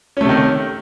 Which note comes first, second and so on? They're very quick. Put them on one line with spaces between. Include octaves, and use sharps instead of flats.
C#4 A3 C3 D#3